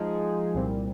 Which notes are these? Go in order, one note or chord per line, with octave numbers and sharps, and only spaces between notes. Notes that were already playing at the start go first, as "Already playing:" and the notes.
Already playing: F3 G#3 D#4 G#4
C2 A#2 G3 C4